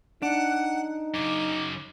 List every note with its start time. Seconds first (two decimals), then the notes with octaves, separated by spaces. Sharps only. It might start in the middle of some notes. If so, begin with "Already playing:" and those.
0.22 D4 D#4 F#5
1.14 F#2 C#3 D6